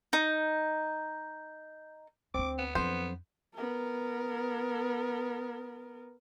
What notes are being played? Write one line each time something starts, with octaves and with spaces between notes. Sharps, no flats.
D#4 G6
D2 C4 D4 D6
B3
F2 F#3 B3 D4 C5
B3 A#4